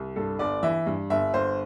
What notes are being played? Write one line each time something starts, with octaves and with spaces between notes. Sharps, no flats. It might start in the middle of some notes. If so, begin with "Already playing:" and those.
Already playing: C2
G2 A4
G1 D5
E3 E5
G2
G1 E5
G1 C5